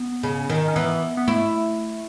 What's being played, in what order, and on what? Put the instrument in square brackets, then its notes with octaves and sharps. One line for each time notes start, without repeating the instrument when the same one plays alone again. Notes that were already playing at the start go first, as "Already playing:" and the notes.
Already playing: [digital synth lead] B3
[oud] C#3
D#3
[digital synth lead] C#4
[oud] E3 [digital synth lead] B3
[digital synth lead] B3
[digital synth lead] A3 [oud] E4